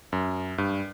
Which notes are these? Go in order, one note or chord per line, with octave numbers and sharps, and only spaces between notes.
F#2
G2